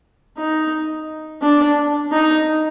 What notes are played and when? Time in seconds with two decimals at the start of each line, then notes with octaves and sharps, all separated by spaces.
0.38 D#4
1.42 D4
2.12 D#4